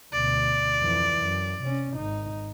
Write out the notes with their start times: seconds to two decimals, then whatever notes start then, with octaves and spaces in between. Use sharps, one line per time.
0.13 D2 B2 D5
0.80 F2 E3
1.22 F#2
1.61 C3 C#4
1.95 G#1 D#4